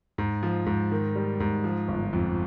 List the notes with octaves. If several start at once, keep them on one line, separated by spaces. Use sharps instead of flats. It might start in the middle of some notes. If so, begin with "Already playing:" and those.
G#2
F3
G#2
D#3
G3
G#2
F3
G1
F2